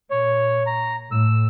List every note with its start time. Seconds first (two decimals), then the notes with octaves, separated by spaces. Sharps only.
0.11 A#2 C#5
0.66 A#5
1.12 A2 E6